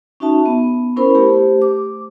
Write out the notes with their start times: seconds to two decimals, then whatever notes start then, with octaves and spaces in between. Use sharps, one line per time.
0.20 C#4 D#4 F#4 E5 A5
0.46 B3
0.97 C#4 E4 A#4 C5 B5
1.15 A3 G4 C5
1.62 D6